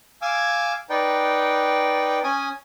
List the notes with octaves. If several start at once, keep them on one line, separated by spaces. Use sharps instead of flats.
F5 G#5 D6 E6
D#4 B4 D5 G5
C#4 G#5 D#6